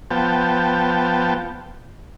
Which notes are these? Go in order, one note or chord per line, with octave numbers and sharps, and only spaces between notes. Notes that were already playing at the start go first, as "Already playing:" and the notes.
F3 B3 G5 A5